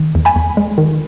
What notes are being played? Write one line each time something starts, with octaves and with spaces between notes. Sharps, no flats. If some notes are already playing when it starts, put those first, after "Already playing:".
Already playing: D#3
E2
G#5 B5
E2
G#3
D#3